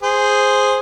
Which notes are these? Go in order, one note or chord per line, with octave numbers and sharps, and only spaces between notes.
G#4 C5